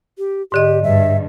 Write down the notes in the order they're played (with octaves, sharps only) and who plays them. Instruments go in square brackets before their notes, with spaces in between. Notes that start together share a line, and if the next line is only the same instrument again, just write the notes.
[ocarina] G4
[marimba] G#2 D3 D#5 [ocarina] G4
[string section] G2 [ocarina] E5